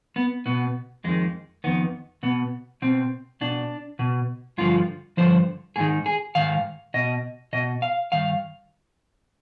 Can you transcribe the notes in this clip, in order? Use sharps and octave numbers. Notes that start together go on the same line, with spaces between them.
B3
B2 B3
F2 D#3 G#3
F2 D#3 B3
B2 B3
B2 C4
B2 D4
B2
G2 D3 F3 F4
G2 D3 F3 C5
G#2 D#3 G#4
G#4
G#2 D#3 F5
B2 D#5
B2 D#5
F5
G2 D#3 F5